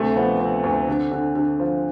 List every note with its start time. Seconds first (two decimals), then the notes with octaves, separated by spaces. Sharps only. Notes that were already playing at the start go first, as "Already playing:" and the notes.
Already playing: D2 C3 A3
0.16 F3 B3
0.39 F3 C4
0.64 D2
0.88 D3
1.11 D3
1.35 D3
1.60 F3